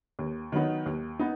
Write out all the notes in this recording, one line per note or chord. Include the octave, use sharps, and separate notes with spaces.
D#2
D#3 F#3 B3 D#4
D#2
B3 D#4